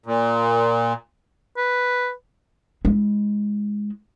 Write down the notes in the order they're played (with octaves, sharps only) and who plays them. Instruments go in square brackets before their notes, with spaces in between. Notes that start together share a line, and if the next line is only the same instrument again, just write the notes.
[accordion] A#2
[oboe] B4
[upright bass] G#3 E4